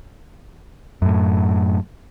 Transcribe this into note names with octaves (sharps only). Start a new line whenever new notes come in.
F#2 A2